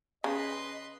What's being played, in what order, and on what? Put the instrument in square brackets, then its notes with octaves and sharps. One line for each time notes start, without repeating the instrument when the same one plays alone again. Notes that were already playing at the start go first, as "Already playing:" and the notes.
[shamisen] C#3 [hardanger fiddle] B4 C6 [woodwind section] D#5